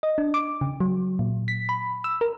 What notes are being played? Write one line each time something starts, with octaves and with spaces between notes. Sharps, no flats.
D#5
D4
D6
C#3
F#3
A#2
B6
B5
E6
A#4